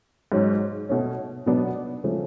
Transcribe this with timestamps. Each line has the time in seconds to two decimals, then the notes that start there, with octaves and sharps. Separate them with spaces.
0.32 G#2 F#3 C#4
0.89 B2 A3 C#4
1.46 B2 F#3 B3 D4
2.04 C#3 F3 A3